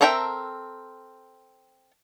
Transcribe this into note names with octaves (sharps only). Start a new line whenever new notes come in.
C4 A4 A#4 E5 G5